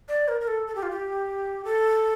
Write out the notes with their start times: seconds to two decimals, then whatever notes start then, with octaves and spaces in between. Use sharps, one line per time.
0.08 D5
0.28 A#4
0.41 A#4
0.48 A4
0.67 A4
0.76 G4
0.83 F4
0.91 G4
1.65 A4